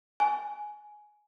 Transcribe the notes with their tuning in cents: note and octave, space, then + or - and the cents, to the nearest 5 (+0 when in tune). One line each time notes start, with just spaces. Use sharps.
G#5 +10